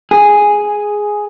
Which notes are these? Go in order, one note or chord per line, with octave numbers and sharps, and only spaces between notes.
G#4